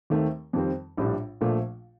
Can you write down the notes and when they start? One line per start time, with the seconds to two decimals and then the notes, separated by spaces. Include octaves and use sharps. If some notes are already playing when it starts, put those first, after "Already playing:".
0.10 D#2 D#3 A3 C4
0.53 F2 D#3 G3 C4
0.98 A#1 A2 G3 D4
1.41 A#1 A#2 F3 A3